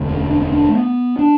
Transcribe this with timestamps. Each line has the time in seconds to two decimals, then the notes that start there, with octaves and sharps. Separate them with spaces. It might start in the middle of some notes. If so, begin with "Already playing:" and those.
Already playing: E1 D2 D3
0.09 C#4
0.30 D4
0.41 C#4
0.53 D4
0.69 A3
0.74 B3
1.19 D4